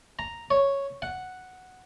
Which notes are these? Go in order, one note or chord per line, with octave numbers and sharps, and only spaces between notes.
A#5
C#5
F#5